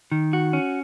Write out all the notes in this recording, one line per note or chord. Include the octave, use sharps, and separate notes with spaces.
D#3
F#4
C#4